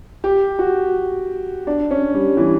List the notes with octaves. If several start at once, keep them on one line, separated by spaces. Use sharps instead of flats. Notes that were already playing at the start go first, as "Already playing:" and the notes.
G4
F#4
D4
C#4
G3
E3